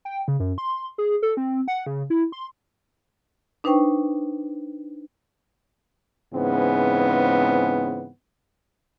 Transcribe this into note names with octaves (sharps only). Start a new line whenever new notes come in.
G5
C#3
F#2
C6
G#4
A4
C4
F#5
C#3
E4
C6
D4 D#4 B4 C5 G5 C#6
G#2 C#3 E3 B3 C4